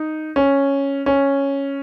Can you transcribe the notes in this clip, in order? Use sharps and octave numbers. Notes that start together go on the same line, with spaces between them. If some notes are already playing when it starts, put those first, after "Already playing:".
Already playing: D#4
C#4
C#4